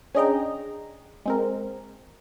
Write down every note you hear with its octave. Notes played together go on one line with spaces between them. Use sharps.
C#4 D4 G#4 D#5 G5 A#5
G#3 C4 A#4